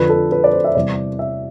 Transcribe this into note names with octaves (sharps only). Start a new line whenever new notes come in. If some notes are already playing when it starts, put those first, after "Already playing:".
Already playing: F2 D3 F3 B4
A4
B4
D5
C5
E5
E2 C3 G3 D5
E5